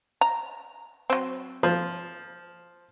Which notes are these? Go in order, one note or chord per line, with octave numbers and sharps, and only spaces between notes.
A#5
F#3 C4
F3